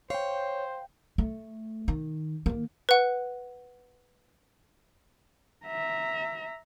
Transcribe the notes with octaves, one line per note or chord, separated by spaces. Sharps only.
C5 C#5 F5 G5
A3
D#3
D#3 A#3
B4 F#5
E5 A#5